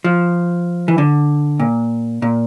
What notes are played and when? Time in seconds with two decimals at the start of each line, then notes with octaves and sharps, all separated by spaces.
0.04 F3
0.88 E3
0.98 D3
1.60 A#2
2.22 A#2